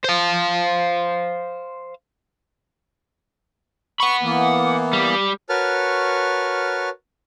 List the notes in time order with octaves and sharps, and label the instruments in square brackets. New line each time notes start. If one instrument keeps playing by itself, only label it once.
[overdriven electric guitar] C5 F5
[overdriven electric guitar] F#5 B5 [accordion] C#6
[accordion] E3 A#3 B3
[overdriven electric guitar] G3
[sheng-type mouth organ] F#4 A#4 B4 C#5 A5 F6